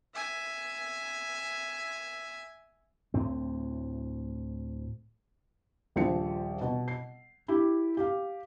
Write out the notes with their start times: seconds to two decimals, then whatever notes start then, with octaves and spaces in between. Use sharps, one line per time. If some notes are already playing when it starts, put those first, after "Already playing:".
0.15 E5 G#5
3.14 D2 A2 C4
5.96 D#1 A#1 F3 C5 C#7
6.61 B2
6.88 C7
7.48 E4 G4
7.97 G4 F5